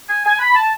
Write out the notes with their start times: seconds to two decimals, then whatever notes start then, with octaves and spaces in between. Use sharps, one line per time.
0.08 G#5
0.25 G#5
0.39 B5
0.55 A5